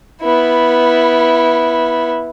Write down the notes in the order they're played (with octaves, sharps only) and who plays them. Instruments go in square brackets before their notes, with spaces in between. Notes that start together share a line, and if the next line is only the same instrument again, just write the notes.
[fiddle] B3 E4